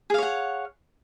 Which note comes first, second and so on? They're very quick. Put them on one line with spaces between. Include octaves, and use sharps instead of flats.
G#4 F5 C#5 F#5